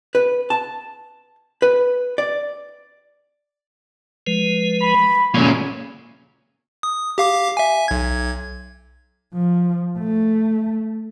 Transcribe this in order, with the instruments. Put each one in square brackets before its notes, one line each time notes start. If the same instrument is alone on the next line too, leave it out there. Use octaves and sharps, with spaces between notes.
[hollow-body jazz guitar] B4
A5
B4
D5
[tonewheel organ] F3 G#3 B4
[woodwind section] B5
[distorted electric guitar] A#2 C#3 [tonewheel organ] F3 G#3 [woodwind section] F#3 C#5
[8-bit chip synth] D#6
G4 F5 D6
E5 G#5
B1 G#6
[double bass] F3
A3